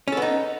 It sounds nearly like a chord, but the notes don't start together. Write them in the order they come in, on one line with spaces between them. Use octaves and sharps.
C#4 A4 B3 D#4